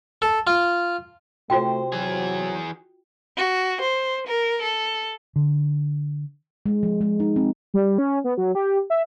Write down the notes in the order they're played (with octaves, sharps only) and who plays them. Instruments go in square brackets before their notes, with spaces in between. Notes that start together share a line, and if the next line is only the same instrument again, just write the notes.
[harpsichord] A4
F4
[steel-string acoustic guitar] C3 C5 [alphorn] A3 [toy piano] F4 F#4 G5
[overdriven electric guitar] E3 G#4 [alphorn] F#3
[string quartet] F#4
C5
A#4
A4
[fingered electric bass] D3
[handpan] G#3
F3
G#3
D#4
C4
[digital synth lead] G3
C#4
B3
F#3
G4
E5